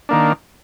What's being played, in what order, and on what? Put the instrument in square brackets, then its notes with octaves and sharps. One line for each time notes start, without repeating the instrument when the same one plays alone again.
[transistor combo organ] D#3 A#3 D4